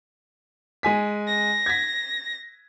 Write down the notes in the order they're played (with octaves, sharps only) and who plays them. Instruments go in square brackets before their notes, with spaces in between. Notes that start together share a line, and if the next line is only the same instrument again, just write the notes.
[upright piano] G#3 G#5 B6
[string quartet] A#6
[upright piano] G#6 B6